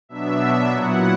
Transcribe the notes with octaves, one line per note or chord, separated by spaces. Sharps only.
B2 F#3 B3 D4 E5
A#2 F#3 B3 E4 F#5